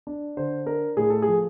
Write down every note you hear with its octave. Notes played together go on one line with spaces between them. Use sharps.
D4
D3 C5
D4 A#4
A2 G#4
A4
F3 G#4